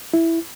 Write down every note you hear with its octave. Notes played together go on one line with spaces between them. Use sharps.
E4